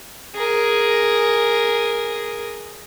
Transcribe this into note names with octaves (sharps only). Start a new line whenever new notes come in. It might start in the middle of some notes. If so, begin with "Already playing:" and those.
G#4 A#4